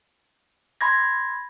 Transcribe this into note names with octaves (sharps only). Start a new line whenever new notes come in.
B5 C6 G#6 A#6